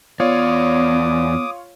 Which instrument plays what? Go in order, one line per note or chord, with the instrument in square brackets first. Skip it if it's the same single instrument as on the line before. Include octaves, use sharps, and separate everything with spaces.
[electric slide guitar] E2 D5 [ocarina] B3 [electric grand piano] F4 C#5 F5 [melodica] D6 D#6